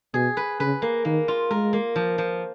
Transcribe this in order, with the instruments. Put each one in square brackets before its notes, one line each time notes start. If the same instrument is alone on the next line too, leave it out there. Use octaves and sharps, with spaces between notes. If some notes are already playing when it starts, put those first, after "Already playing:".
[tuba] B2 [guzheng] G#4
[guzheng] B4
[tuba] C#3 [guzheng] B4
[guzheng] A#3
[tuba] D#3 [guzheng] A#3
[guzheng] F4
[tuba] G#3 [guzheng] A#4
[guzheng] A#3
F3
F3